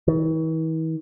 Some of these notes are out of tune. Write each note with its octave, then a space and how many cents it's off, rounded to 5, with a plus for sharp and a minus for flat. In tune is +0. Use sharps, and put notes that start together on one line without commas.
E3 -45